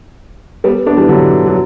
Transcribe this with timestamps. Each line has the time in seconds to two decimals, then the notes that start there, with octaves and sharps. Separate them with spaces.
0.64 G3 B3
0.87 B3 D4
0.97 E3 G3
1.09 D3 F#3
1.46 F#3